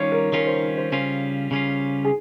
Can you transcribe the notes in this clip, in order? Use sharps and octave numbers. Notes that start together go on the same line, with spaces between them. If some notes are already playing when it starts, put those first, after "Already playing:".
Already playing: D#3 G3 C#4 F4 C#5
A#4
D#3 G3 C#4 F4 A#4
C5
C5
C#3 G3 C#4 F4
C#3 G3 C#4 F4
G#4